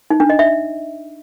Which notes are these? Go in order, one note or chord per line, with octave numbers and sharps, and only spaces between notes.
D#4
D4
D#5
E5